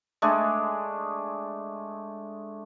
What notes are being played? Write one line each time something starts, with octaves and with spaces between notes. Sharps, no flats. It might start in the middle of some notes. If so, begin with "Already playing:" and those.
G#3 A3 D4 G#4